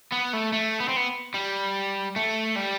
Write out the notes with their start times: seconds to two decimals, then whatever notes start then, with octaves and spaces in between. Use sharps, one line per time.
0.12 B3
0.33 A3
0.53 A3
0.80 B3
0.88 C4
0.96 B3
1.34 G3
2.16 A3
2.56 G3